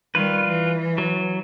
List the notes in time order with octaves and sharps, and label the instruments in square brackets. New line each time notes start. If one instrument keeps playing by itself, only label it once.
[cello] D#3 G3 [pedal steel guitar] F4 B4
[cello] E3
[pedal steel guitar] F#3